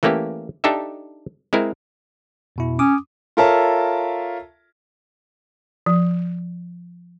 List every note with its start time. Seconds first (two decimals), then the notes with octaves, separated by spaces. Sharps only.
0.03 E3 A3 A#3 C#4 G4
0.64 D4 D#4 G4 A4 E5
1.53 G#3 C4 E4 A#4
2.56 F2 B2 E4
2.79 C#4 D6 D#6
3.37 F4 A4 A#4 C#5 E5 A5
5.86 F3